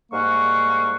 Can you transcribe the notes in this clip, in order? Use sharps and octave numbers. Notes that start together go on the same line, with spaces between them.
G#2 G3 A#3 F#5 C#6